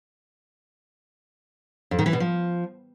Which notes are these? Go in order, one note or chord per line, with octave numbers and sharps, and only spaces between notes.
F2
D#3
E3
B2
F3